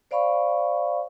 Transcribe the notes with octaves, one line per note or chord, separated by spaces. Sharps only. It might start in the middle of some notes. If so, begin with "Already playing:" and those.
C5 D5 F5 B5 C#6